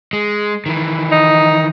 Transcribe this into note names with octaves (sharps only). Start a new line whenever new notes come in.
G#3
D#3 E3
D#4